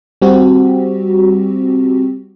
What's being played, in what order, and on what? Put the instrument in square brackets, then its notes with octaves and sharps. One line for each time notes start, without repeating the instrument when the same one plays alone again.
[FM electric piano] G3 C4 F#4 G4